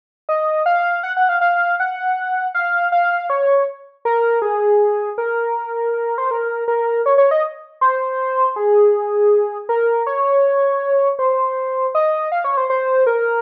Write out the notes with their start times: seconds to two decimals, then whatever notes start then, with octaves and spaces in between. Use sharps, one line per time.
0.29 D#5
0.66 F5
1.03 F#5
1.17 F#5
1.29 F5
1.41 F5
1.80 F#5
2.54 F5
2.92 F5
3.30 C#5
4.05 A#4
4.42 G#4
5.18 A#4
6.18 C5
6.31 A#4
6.68 A#4
7.06 C#5
7.18 C#5
7.31 D#5
7.81 C5
8.56 G#4
9.69 A#4
10.07 C#5
11.19 C5
11.95 D#5
12.32 F5
12.44 C#5
12.57 C5
12.70 C5
13.07 A#4